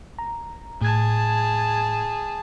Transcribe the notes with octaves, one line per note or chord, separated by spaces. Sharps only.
A#5
A2 G#4 A5 G#6